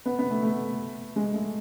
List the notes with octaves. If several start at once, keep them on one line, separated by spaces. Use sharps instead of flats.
B3
B3
A3
A3
G#3
A3